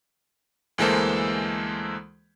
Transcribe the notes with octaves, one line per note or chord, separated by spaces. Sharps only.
D2 E3 G#3 A#3 A4 C5